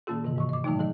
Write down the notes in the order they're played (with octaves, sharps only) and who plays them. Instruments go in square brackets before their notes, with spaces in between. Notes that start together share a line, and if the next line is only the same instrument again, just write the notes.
[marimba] A#2 D#3 A#3 C#4 F4 G#4
G2 C3 D#3 E3
G#2 E3 C#6
D#5 D6
A2 D#3 E3 F#3 A3 D#4
E3 F#3 G#4 D#5